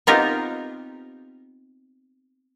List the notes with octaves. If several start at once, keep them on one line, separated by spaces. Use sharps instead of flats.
B3 C4 D#4 F4 G4 A#4